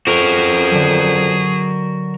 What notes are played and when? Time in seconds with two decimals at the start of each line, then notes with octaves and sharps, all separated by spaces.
0.07 F2 F#4 G#4 A#4
0.71 D3 F#3